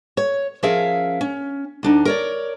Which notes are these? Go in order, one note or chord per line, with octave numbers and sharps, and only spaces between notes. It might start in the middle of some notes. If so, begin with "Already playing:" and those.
C#5
F3 C#4 G#4 A#4 E5 F5
C#4
D2 D4 D#4
A#4 C#5 D5